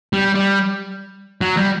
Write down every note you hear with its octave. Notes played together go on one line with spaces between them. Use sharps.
G3
G3
F#3
G3